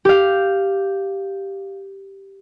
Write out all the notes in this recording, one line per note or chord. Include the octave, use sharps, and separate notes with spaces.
G4 F5